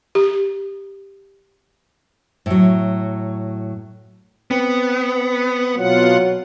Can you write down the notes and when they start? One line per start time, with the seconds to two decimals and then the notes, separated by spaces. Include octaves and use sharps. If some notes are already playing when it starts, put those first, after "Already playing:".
0.15 G4
2.46 A2 F#3
4.51 B3 C4 C5
5.77 B2 F#3 F4 F#5